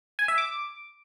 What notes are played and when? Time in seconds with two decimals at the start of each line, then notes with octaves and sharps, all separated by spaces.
0.19 G#5
0.28 E5
0.38 D6